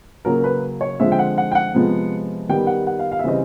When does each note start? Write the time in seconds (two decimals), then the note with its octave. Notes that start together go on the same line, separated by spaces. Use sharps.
0.25 C#3 F#3 A#3 A#4
0.44 B4
0.81 C#5
0.99 D3 F3 G#3 C4 E5
1.12 G5
1.19 F#5
1.38 F#5
1.52 G5
1.55 F#5
1.74 C3 F3 G#3 B3
2.49 D#3 G3 B3 G5
2.67 F#5
2.87 F#5
2.99 F5
3.12 F5
3.19 E5
3.24 C#3 E3 G3 C4 D#5